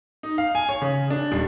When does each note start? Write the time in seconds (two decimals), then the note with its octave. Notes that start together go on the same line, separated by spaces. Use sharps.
0.23 D#4
0.38 F5
0.55 G#5
0.69 C#5
0.82 C#3
1.10 D4
1.32 D#1